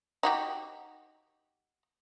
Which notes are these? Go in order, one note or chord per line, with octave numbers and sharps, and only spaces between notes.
D#4 F#4 G4